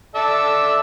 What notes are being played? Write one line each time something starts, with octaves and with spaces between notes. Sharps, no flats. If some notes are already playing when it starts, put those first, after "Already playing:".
A4 D5 E5